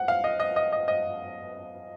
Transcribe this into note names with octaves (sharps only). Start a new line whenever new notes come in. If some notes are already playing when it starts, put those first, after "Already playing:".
Already playing: F#5
F5
D#5
D#5
D#5
D#5
D#5